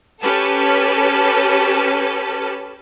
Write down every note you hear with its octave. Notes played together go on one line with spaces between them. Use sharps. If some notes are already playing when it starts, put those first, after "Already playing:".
C#4 G4 A4 B4 A5